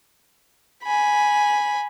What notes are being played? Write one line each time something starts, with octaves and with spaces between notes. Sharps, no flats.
G#5 B5